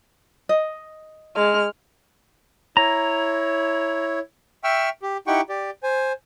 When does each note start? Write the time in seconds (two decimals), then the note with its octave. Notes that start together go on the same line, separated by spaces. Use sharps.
0.49 D#5
1.36 G#3 F6
2.77 E4 C#5 A#5
4.64 E5 G5 C#6 E6 F6
5.02 G4
5.27 D#4 E4 G4 F#5 G5 C#6
5.49 G4 D5
5.83 C5 G#5